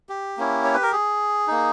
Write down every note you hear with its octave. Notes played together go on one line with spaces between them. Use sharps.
G4
A#3 C#4 E4
C#5
B4
A#4
G#4
A#3 D#4